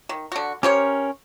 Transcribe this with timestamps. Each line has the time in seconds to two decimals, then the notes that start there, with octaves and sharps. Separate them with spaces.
0.09 D#3
0.32 D3 F#4
0.63 C#4 G4 A#4 C5 C#5